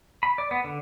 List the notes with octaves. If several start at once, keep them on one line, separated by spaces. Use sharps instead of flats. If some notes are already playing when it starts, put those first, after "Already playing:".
B5
D5
B3
D3